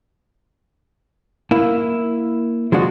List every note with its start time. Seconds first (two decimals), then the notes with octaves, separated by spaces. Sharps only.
1.51 A#3 E4
2.72 F3 G#3 D4 F#4